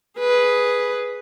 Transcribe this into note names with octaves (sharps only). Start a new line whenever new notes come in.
G#4 B4